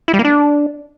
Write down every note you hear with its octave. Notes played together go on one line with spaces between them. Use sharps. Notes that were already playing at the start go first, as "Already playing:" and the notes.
E4
G3
A#3
D4